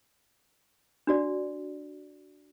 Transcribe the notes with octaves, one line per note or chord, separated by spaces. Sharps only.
D4 F#4 D5